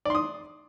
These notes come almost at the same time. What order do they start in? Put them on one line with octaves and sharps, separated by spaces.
D5 C6 D#6